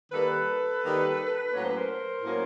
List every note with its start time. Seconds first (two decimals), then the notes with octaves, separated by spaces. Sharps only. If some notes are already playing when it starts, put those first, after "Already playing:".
0.12 D#3 G3 A#3 A4 B4
0.82 D#3 G3 A#3
1.52 A2 F#3 A#3 C#4 C#5
1.61 C5
1.69 B4
1.76 A#4 C5
2.23 A2 F#3 A#3 C#4